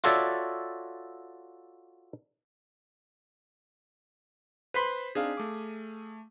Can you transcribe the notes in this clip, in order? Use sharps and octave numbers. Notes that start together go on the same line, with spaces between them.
F4 F#4 A4 C#5 D5 E5
B4 C5 B5 C6 B6
C4 D4 D#4 G#4 F5
A3 D6